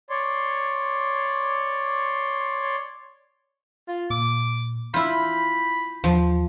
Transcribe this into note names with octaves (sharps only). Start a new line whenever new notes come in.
C#5 D5 C6
F4
A#2 D6
E4 F4 B5 G6
D#2 F3